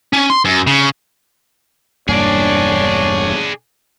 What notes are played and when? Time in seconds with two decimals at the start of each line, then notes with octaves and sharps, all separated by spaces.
0.13 C#4
0.30 C6
0.45 F#2
0.67 C#3
2.09 E1 G2 A#3 D4 G#4 C#5 D5